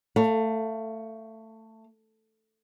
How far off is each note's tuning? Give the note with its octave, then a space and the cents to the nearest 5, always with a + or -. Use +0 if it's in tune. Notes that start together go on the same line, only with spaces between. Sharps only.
A3 +15 F5 +0